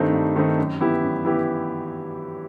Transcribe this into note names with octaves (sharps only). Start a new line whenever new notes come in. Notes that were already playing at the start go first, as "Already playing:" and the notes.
Already playing: G2 D#3 A3 C4 D#4
G2
D#3 A3 C4 D#4
F#2
E3 B3 E4 G4
F#2
E3 B3 E4 G4